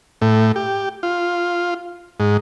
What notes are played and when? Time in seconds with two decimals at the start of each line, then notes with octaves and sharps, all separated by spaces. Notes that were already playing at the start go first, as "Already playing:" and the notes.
0.22 A2
0.56 G4
1.03 F4
2.20 G#2